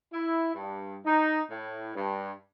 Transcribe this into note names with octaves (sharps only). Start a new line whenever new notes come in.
E4
G2
D#4
A2
G2